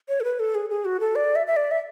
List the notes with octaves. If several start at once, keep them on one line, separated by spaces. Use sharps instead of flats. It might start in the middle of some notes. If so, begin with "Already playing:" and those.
C#5
A4
B4
A4
G#4
G#4
F#4
A4
D5
E5
E5
D5
E5